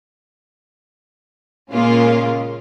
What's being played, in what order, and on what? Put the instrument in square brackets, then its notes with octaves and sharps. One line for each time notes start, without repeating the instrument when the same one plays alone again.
[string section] A#2 C#3 G#3 A#3 C#4 F4